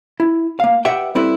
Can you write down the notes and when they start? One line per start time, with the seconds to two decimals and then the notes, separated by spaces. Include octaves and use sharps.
0.20 E4
0.60 A#3 F5
0.85 G4 B4 D5 E5 F#5 G5
1.15 G3 C4 E4 A4 B4